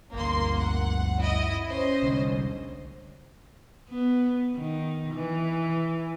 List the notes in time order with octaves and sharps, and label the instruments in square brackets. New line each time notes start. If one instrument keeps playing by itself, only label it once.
[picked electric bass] G1 D2 [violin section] A#3 C6
[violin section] F#5
E4 D#5
C#4 C5 D#5
[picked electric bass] C2 D3
[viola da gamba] B3
D#3
E3